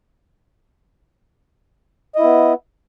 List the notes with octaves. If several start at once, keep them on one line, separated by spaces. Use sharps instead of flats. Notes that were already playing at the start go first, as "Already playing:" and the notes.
B3 E4 D#5